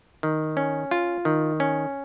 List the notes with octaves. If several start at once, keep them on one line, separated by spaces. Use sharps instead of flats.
D#3
C#4
F4
D#3
C#4